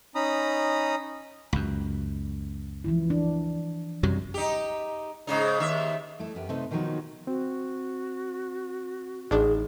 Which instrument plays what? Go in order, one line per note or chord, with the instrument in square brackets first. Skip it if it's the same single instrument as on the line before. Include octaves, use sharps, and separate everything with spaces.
[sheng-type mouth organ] C#4 D#4 A#5 B5 D#6
[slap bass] C#2 F#2
[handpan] E3 F3 E4
D4
[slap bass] F#2 C3 F#3 [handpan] G3
[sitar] D#4 G4
G#2 C#3 D#4
D#2 E5
[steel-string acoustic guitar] A3 E4 A4
F#2 B3 G4
C3 A3 D#4 B4 C5
B2 D#3 F3 F#3 D#4 F#4
[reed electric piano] C4 [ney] F#4
[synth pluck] A1 D4 [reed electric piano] D#4 [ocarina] G#4